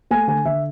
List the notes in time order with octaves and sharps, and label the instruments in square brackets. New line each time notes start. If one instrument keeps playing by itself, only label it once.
[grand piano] A3 G#5
D3 G#5
D3 E5